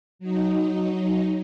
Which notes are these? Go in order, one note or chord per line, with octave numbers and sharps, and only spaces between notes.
F#3 D#4